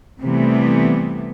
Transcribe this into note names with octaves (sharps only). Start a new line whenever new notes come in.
C3 E3 G3 A3 B3